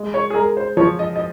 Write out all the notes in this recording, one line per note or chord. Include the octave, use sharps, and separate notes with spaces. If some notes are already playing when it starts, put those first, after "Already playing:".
Already playing: G#3
C#5
G#4
G#3 A#4
C5
F3 C#5
D#5
D#5